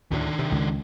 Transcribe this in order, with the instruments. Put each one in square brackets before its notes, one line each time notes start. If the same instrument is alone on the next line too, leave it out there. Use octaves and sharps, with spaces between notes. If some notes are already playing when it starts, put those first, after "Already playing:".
[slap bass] D2 A2 [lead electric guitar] D#3 D4
[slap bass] C3
C#2